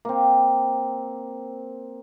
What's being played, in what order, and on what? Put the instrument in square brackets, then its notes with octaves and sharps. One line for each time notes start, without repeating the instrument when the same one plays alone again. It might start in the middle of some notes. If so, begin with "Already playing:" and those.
[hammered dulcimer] A#3 C4